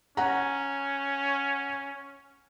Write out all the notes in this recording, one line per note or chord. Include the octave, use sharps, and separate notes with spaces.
C#4 F#5 A#5